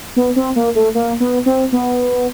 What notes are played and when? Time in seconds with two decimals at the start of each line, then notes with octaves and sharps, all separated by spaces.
0.16 B3
0.36 C4
0.56 A#3
0.75 A3
0.95 A#3
1.20 B3
1.46 C4
1.72 B3